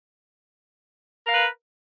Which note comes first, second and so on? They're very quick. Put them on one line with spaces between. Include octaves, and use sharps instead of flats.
A#4 F5 B4